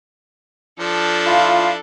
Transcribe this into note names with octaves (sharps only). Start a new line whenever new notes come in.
F3 D4 A4
E4 F4 F5